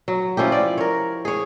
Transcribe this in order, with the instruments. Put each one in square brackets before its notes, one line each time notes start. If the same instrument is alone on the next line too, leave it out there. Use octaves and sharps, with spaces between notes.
[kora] F#3
F3 C#4 E4 G4
D5
A#4 C#5
G#4 C#5